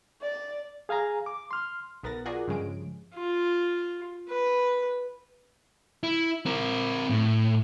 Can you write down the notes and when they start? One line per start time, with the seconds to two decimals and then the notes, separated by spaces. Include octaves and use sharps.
0.22 D5
0.89 G#4 F5 G#5 A#5
1.26 D6
1.51 C6 F6
2.03 B1 B3 A#4 F#5 A6 A#6
2.25 F4 F#4 G#4 A#4 D5 F#5
2.48 G2 C#3 F3 G#3 C#4 D7
3.15 F4
4.29 B4
6.03 E4
6.46 C4 A#4
7.10 A2